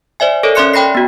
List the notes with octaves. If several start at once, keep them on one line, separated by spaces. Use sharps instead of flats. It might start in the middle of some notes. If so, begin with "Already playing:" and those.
C5 D5 E5 G#5
A4 A#4 C#5 D#5
C#4 D5 E5 C6 F#6 C#7
C#5 G5 B5 A#6 C7
B3 F#4